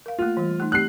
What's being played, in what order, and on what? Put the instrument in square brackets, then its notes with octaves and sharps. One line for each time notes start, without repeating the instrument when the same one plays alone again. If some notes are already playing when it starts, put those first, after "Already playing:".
[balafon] A#4 F5
[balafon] A3 A#3 [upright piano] F4
[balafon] E3 G3
A3 D#4
[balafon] A3 C4 G4 [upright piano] F#6 C7